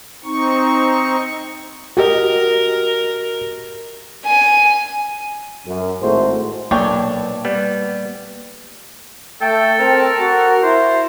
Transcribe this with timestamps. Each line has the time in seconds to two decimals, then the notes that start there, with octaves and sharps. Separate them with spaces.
0.24 C4 D#4 C#6
1.97 F#4 G4 A#4 D#5
4.26 G#5
5.67 F#2
6.02 G#1 A2 G#3 A3 F#4 C5
6.71 B1 A#3 D4 C#5 G5
7.45 G3 B3
9.42 A3 A4 G5
9.79 C4 A#4
10.20 F#4
10.63 E4 C5